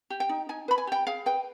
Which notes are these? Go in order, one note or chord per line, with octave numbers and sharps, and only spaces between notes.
G4
G5
D#4
D#4 G#5
B4 B5
G#5
G4 G5
G#4 F5
B4 G5